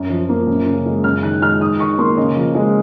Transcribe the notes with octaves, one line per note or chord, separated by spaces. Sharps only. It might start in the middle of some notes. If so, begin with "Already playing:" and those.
Already playing: F#2
F3
A#3
F#2
C#3
G#3
F#2 F6
D#3 F#6
G#3 F6
G#2 D#6
D#3 C#6
A#3 C6
C#3 D#5
F3
G#3